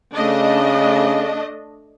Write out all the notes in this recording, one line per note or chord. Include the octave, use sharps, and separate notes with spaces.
C#3 A3 D4 D#5